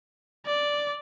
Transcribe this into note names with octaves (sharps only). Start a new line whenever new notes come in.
D5